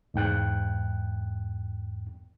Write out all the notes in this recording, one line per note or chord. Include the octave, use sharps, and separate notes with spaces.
E2 G#2 G5 F#6